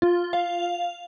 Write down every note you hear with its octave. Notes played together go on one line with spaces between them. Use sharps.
F4
F5